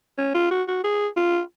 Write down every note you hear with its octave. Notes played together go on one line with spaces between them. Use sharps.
C#4
F4
F#4
F#4
G#4
F4